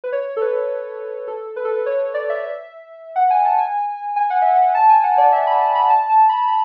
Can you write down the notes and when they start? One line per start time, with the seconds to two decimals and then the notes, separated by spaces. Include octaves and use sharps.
0.04 B4
0.12 C#5
0.37 A4
0.41 B4
1.28 A4
1.56 B4
1.65 A4
1.74 B4
1.86 C#5
2.14 D5
2.30 E5
2.43 E5
3.16 F#5
3.30 G#5
3.45 A5
3.58 G#5
4.16 G#5
4.30 F#5
4.42 E5
4.55 F#5
4.75 A5
4.89 G#5
5.03 F#5
5.18 D5
5.32 E5
5.47 B5
5.61 A5
5.75 B5
5.90 A5
6.10 A5
6.29 B5
6.48 B5